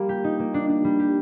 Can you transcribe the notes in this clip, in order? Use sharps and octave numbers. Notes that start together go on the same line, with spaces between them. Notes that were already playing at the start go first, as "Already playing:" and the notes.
Already playing: G3 A#3 F4
G4
D#4
A#3
D4
D4
G3
G4